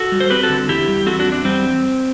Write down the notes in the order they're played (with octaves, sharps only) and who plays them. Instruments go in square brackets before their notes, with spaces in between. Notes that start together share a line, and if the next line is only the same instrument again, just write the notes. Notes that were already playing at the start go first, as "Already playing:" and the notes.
Already playing: [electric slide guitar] F#4 A4
G3
C5
C4 G4 B4
F#4 A4
D3
E2 E4 G4
G3
C4 F#4 A4
D4 F#4
E2
D4
G3 C4